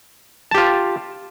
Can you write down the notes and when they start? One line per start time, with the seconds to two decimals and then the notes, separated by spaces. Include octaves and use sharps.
0.51 A5
0.54 G4
0.58 F4